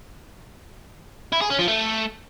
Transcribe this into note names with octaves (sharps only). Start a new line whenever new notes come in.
E4
G#4
C#4
F3
A3